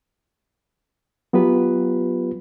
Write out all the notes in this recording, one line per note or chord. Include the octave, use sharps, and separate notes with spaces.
F#3 B3 F4 G4 B4